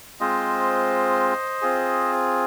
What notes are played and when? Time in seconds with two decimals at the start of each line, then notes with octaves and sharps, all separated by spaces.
0.20 G#3 C4 F4 C5 D#5
1.62 C4 F4 G#4